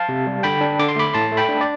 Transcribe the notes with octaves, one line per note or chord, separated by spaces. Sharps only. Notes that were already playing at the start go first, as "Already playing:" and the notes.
Already playing: F5 A5
C3
G3
D3 G5 B5
D4
D3 D6
C6
A3 B5 D6
A2 A5 C6
A3
G5 B5
D4
D5